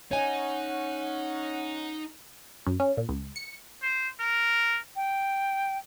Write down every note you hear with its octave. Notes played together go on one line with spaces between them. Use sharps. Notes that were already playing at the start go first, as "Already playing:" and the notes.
C#4 D#4 C#5 F#5 G#5
F#2
C#4
A#2
C#2
C#7
C5
A#4
G5